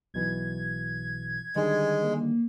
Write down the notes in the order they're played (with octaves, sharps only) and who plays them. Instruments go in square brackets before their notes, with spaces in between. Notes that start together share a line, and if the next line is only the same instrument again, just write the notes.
[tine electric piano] B1 B2 E3 [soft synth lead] G#6
[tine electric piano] D3 D#3 G3 [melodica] G#3
[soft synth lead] A#3